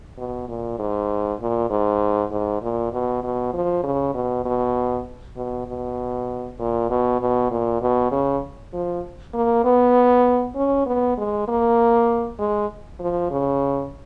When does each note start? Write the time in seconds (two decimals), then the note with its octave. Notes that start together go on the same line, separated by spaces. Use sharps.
0.18 B2
0.48 A#2
0.79 G#2
1.40 A#2
1.70 G#2
2.31 G#2
2.62 A#2
2.93 B2
3.24 B2
3.53 F3
3.84 C#3
4.14 B2
4.45 B2
5.37 B2
5.67 B2
6.59 A#2
6.90 B2
7.21 B2
7.51 A#2
7.81 B2
8.11 C#3
8.73 F3
9.34 A#3
9.64 B3
10.55 C#4
10.86 B3
11.18 G#3
11.48 A#3
12.39 G#3
13.00 F3
13.31 C#3